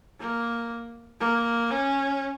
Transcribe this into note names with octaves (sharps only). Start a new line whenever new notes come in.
A#3
A#3
C#4